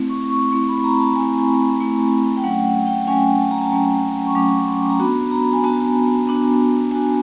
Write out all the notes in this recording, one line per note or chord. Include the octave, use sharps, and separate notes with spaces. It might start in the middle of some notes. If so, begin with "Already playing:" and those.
Already playing: A3 C4 E4
C#6
C#6
A3 C4 E4 C6
B5
A#5
A5
A3 C4 E4 G#5
A3 C4 E4
G5
F#3 A3 C#4 F#5
F#5
G5
F#3 A3 C#4 G#5
A5
A#5
A5
F#3 A3 C#4
C#6
F#3 A3 C#4 D6
C6
A#5
B3 D4 F#4 B5
A#5
G#5
B3 D4 F#4 A5
B3 D4 F#4
B3 D4 F#4 G#5